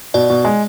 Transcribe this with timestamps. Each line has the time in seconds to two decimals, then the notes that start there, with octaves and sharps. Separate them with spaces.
0.14 B2 D5
0.30 B2
0.45 G#3